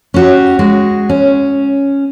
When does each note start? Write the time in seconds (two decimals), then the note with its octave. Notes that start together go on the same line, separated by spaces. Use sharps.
0.14 C#4 F#4 G4
0.59 G#3 F#4
1.09 C#4